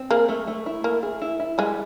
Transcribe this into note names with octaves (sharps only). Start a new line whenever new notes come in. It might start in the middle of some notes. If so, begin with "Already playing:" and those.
Already playing: C4
A#3 G#4
A3
A3
E4
A3 A#3
G#4
E4
E4
G3 G#3